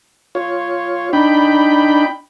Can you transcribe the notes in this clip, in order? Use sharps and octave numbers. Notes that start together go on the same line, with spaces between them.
F4 C#5
D4 D#4 G5 B5